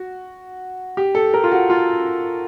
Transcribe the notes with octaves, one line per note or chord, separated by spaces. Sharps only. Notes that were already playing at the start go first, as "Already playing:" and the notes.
Already playing: F#4
G4
A4
A#4
F4
F#4
F4